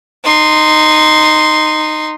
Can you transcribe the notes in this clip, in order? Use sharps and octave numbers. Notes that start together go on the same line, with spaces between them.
D#4 C6